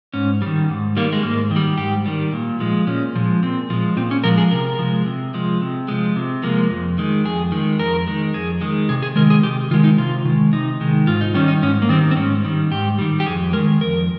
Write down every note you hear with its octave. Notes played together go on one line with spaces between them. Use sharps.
G#2 C#4
D#3 G3
G#2
D#3 G3 A#3
G#3
G#2 A#3
D#3
G3
G#2 G4
D#3 G3
A#2
F3 G#3
A#2 C#4
F3 G#3
A#2 C4
F3 G#3
A#2 C4
C#4
F3 G#3 A#4
G#4
C3 A#4
F3 G#3
C3
F3 G#3
C3
F3 G#3
C3
F3 G#3 A#3
F2
D#3 G#3
F2 G#4
D#3 G#3
F2 A#4
D#3 G#3
F2 G#4
D#3 G#3
C3 G#4
G#4
D#3 G#3 A#4
G#4
C3 G4
D#3 G#3 F4
D#4
C3 F4
D#3 G#3
C3 D#4
D#3 G#3
G#2 F4
D#4
D#3 G3 C#4
D#4
G#2 C#4
A#3
D#3 G3 C4
C4
G#2 C#4
D#3 G3
G#2 G4
D#3 G3
G4
F2 G#4
D#3 G#3 A#4
F2 A#4